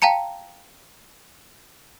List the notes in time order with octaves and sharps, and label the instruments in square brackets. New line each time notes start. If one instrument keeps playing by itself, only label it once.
[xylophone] F5 G5 A5 A#5 C#7